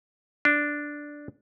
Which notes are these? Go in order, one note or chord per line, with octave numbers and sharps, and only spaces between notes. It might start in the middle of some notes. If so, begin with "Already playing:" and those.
D4